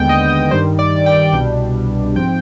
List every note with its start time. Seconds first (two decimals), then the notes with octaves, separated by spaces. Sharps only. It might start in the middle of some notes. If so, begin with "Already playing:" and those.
Already playing: D#2 D3 G#3 B3 G5
0.09 D#5
0.30 D#5
0.50 G2 D#3 G3 C5
0.79 D5
1.06 G5
1.33 C2 B2 G3 D4
2.16 G#2 F3 C4 G5